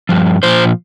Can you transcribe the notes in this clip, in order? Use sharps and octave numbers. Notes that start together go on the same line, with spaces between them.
G2 F3
A#2 F3 C5